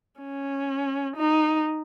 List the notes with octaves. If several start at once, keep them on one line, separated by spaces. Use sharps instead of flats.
C#4
D#4